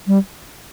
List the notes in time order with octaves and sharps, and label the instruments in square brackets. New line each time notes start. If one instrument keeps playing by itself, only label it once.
[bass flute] G3